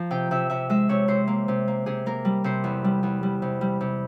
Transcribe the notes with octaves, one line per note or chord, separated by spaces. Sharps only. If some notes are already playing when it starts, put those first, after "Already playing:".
Already playing: F3 A#5
C3 G5
C3 E5
C3 E5
G#3 E5
C3 C#5
C3 C5
A#3
C3
A#3
C3 G#4
A#3 A#4
G3
C3 C5
E2
G3
E2
G3
C3
G3
C3